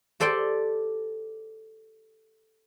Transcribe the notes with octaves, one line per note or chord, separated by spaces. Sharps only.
G4 A4 C5 D5 G5